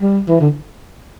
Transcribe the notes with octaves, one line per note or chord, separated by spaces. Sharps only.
G3
E3
D3